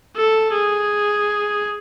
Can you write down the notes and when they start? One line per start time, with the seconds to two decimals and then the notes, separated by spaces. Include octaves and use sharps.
0.17 A4
0.53 G#4